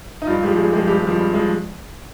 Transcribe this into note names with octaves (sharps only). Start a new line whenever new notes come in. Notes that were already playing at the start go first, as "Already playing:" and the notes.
D#4
G2 F4
F3 G#3 G4
G2 G#4
F3 G#3 G4
G2 G4
F3 G#3
G2
F3 G#3